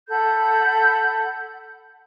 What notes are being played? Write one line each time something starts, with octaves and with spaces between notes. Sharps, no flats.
A4 F#5 B5 G6